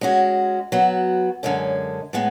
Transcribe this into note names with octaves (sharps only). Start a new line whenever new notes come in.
G#3 C#4 F#4
F#3 B3 F#4
F#2 D3 G#3 C#4
A2 G#3 B3